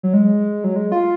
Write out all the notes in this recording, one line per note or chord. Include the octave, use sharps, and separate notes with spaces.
F#3
G#3
F#3
G#3
F4